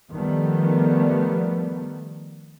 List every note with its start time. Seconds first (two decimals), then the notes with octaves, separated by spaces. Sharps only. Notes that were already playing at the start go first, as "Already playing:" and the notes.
0.12 D#3 F3 G3 A3 B3